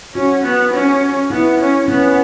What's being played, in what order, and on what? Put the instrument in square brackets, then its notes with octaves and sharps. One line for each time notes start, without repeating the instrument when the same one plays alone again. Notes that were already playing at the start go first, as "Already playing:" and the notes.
[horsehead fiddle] C#4 [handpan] F#4
[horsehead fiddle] B3
C#4
[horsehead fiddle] B3 [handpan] E4
[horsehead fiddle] C#4
[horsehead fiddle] B3 [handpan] C#4